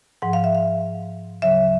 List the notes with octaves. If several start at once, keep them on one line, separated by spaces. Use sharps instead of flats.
G#2 F3 F#5
F5
E5
F5
D2 C#3 F#3 E5